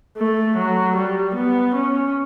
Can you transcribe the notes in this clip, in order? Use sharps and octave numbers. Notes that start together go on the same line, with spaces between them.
A3
F#3
G3
B3
C#4